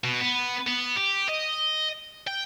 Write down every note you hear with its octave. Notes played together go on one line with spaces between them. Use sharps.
B2
B3
B3
G4
D#5
G5